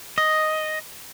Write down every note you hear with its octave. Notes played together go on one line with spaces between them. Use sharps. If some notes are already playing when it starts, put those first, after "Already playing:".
D#5